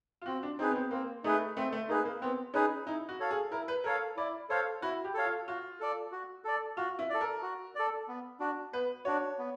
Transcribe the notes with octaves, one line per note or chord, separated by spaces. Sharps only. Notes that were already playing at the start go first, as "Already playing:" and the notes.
F4
C4 F#4
D4
C4 D#4 G#4 B4
B3
C4
A#3 C4
A3 D#4 G#4 B4
A3 C4
A3
A#3 D#4 G#4 B4
A#3
B3 C4
C#4 D#4 G#4 B4
D#4 E4
F#4
A4 C#5 F5
G#4
E4 A#4
B4
A4 A#4 C#5 F5
E4 D5
A4 C5 C#5 F5
E4 F#4
G4
A4 C#5 F5
F4
F4 F#4
A4 D5
F#4
A4 D5
F4 F#4
E4
A4 D5
A#4
F#4
A4 D5
B3
D4 F#4
B3 B4
D4 F#4 C#5
B3